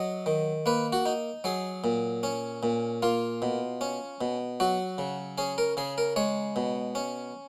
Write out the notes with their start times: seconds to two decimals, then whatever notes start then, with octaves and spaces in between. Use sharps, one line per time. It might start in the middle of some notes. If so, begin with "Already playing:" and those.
Already playing: F#3 D#5
0.26 D#3
0.66 A#3 B4
0.93 F#4
1.06 D#4
1.44 F#3 G#4
1.84 A#2
2.23 C#4
2.63 A#2
3.03 A#3 F4
3.42 B2
3.81 C#4
4.21 B2
4.60 F#3 F#4
4.98 C#3
5.38 C#4 G#4
5.58 A#4
5.77 C#3 G#4
5.98 A#4
6.16 G#3 C#5
6.56 B2
6.95 C#4